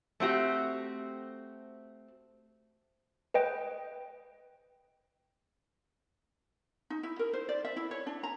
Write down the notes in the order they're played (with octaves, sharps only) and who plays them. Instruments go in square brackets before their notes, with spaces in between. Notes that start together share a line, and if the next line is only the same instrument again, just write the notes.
[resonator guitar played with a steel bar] A3 C4 F#4 G4
[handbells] B4 D#5 G5
[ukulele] D#4
E4
A#4
C5
D5
E5
E4
C#5
D4
A#5